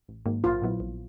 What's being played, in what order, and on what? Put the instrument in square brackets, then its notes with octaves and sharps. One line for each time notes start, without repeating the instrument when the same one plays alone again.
[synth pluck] A1
G#2 D#3 F#3 A#3
[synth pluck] A#1 [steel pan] F4
[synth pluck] A#2 F#3 B3 E4
A#1